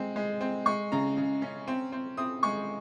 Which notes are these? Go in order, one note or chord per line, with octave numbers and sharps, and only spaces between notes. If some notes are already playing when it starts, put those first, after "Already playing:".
Already playing: G#3 C4
G#3
C4
G#3 C#6
C#3 A#5
C#3
C#4
C4
C4
C4 D#6
G#3 C#6